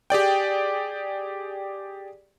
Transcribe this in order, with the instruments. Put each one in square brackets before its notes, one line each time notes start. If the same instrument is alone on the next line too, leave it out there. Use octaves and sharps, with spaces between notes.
[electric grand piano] G4 G#4 D5 G5